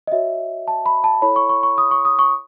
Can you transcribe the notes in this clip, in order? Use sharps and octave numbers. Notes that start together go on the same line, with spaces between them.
D#5
F#4 C#5 E5
A5
B5
A5
E4 A4 C#5 B5
C#6
C#6
C#6
D#6
C#6
D#6
C#6